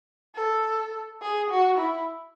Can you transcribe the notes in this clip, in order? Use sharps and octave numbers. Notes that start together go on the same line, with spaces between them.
A4
G#4
F#4
E4